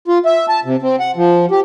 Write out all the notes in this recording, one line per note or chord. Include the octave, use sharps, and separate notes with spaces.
F4
E5
A5
C3
C4
F#5
F3
G4